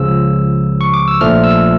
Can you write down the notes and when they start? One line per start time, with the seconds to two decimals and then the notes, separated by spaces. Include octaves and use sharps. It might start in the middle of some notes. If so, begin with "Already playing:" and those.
Already playing: C#2 C#3 F3 E6
0.81 C#6
0.94 D6
1.08 E6
1.21 A#1 A#2 F3 A3 F6
1.44 E6